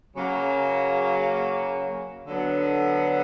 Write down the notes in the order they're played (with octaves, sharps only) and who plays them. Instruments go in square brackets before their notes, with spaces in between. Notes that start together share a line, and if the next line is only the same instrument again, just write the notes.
[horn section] C#3 F#3 A#3
D3 F#3 B3